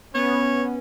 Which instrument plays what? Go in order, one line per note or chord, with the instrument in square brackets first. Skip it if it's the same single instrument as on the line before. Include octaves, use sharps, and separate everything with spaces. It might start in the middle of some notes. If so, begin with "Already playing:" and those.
[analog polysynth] B3 [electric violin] C#4 [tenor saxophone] C#5